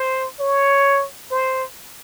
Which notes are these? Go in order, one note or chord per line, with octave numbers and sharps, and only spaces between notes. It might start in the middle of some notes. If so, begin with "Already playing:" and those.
Already playing: C5
C#5
C5